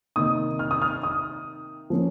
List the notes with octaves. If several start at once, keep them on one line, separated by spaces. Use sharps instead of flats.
C3 D#3 A#3 D#4 D#6
F6
D#6
F6
D#6
F3 A#3 C#4